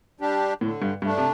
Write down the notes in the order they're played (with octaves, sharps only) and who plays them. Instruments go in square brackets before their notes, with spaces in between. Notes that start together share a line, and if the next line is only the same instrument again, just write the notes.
[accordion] G3 D4 G4
[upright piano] A2 [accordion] D3
[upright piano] G2
[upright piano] G2 [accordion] A3 D4
[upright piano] C3